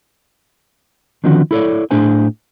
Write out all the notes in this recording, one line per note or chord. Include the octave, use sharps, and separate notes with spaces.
D3 D#3 F3 B3 C#4 F#4
E4 A4 C#5 D5
A2 D4 G#4 C5 G#5